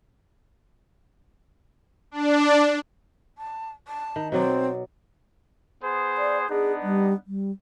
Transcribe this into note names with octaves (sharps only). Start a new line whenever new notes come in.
D4
A5
A5
D#3
B2 F#3 C4 D5
B3 G#4 C5
D5
B3 D4 D#4 G#4
G3
G3